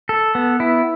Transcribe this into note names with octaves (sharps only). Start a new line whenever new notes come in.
A4
B3
E4